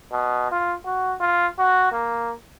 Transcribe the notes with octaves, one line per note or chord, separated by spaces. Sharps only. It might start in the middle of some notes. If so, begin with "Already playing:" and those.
B2
F4
F#4
F4
F#4
A#3